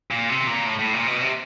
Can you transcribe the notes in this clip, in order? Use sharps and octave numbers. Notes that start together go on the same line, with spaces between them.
A#2
C3
A#2
A2
A2
A#2
B2
C3